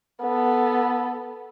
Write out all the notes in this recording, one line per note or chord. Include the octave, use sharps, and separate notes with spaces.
B3 A4